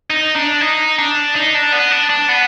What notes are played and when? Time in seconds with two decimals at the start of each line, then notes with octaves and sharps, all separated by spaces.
0.10 D#4
0.36 D4
0.61 D#4
0.99 D4
1.36 D#4
1.55 D4
1.73 B3
1.92 D4
2.10 D4
2.29 B3